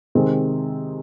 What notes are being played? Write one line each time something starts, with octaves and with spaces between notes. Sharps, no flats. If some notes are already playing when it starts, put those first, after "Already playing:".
C3 D#3 G#3 C4